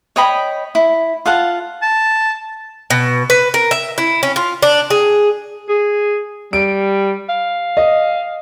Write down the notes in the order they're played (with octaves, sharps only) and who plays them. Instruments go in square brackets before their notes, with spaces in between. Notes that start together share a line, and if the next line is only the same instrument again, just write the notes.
[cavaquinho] C#5 D#5 G5 B5
E4
F4 F5 F#5 A5
[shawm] A5
[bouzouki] B2
B4
A#4
E5
E4
C#4
F4
D4
G#4
[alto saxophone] G#4
[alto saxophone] G3 [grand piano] D7
[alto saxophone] F5
[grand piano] D#5